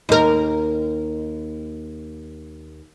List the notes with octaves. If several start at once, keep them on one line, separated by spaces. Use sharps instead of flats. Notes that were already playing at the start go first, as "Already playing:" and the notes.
D#2 A#4